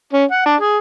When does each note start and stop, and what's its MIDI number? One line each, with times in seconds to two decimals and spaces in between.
0.13 0.24 61
0.31 0.42 78
0.46 0.55 62
0.61 0.78 68